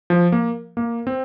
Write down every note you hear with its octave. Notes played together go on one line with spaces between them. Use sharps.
F3
A#3
A#3
C4